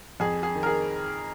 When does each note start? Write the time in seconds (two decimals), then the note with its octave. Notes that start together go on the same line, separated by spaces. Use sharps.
0.20 F2 G#4
0.43 G#4
0.55 D#3
0.63 A#4
0.66 G#4